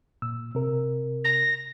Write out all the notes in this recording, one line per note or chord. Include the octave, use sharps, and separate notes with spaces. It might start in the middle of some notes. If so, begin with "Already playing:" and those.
A#2 E6
C3 A#4
A#6